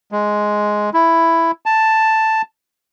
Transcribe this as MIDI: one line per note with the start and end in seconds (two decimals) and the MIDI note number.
0.12 0.90 56
0.94 1.51 64
1.66 2.42 81